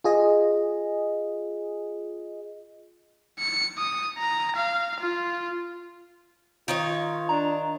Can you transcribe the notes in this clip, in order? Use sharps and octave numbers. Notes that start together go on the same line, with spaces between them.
F4 G#4 D#5
C#7
D#6
A#5
F5
F4
D#3 D#4 F4 C#5
D4 A#5